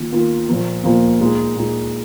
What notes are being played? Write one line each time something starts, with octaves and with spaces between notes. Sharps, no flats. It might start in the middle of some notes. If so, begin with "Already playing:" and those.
Already playing: D#3 A#3 F4
D#3 A#3 F4
A#2 F3 A#3
A#2 F3 A#3
A#2 G#3 D#4
A#2 G#3 D#4